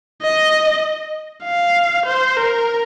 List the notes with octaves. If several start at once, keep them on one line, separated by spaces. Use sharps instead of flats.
D#5
F5
C5
A#4